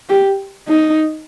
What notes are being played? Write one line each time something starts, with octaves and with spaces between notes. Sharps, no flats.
G4
D#4